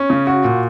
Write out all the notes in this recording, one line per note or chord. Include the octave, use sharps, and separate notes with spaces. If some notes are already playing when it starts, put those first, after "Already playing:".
Already playing: C#4
C#3
F#4
A#2